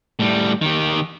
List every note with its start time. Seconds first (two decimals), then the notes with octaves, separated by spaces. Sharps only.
0.19 A2 G3
0.62 D#3 G4